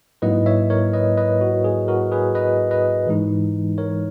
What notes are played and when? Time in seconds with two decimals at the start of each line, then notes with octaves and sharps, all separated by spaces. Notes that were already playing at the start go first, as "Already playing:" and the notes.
0.22 G#2 F#3 A#3 E4 B4 D#5
0.46 C#5 E5
0.70 A#4 C#5
0.93 B4 D#5
1.17 B4 D#5
1.41 F#4
1.64 G#4
1.88 F#4 A#4
2.12 G#4 B4
2.35 B4 D#5
2.71 B4 D#5
3.07 G#2 E3 G#3 D#4
3.78 A#4 C#5